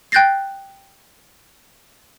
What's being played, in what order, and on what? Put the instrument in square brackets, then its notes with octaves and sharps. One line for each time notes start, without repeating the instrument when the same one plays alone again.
[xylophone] G5 F#6 G6 A6 A#6 C7